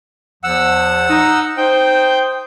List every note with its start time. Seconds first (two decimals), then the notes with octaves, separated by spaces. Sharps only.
0.44 E2 F3 F#5 E6
1.10 D#4
1.58 D#4 C5 G5